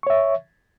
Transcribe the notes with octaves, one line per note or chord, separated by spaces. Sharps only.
C#5 E5 C#6